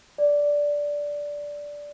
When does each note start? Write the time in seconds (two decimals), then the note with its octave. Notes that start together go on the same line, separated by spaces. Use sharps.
0.18 D5